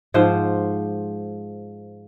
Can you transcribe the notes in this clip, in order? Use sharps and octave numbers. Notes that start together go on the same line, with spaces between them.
G#2 F3 C5